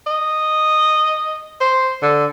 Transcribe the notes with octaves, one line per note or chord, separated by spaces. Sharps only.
D#5
C5
D3